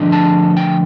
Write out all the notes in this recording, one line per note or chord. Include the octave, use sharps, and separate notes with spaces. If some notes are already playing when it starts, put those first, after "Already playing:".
Already playing: D3 F3 A3 D4
A5
G5